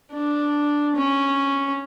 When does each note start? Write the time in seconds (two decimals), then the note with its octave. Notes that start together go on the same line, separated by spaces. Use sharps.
0.13 D4
0.96 C#4